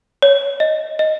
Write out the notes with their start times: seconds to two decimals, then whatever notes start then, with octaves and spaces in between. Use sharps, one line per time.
0.22 C#5
0.60 D#5
0.99 D#5